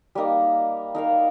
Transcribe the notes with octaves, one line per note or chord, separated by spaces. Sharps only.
G3 A#3 D#4
D#4 A#4 F5